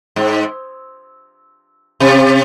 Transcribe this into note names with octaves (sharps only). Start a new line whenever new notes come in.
G#2
C3